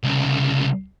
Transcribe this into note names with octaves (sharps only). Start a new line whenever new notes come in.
C2 C#3